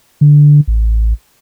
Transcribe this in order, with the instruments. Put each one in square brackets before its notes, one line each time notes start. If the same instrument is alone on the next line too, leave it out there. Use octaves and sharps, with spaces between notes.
[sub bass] D3
A1